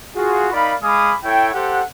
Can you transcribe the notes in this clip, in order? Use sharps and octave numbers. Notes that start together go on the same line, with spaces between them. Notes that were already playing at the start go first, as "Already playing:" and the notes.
F4 F#4 G#4
D#4 A#4 D5 F5 B5
G#3 F5 G#5 B5 D6 D#6
E4 A4 C#5 G5
G4 A4 C5 F#5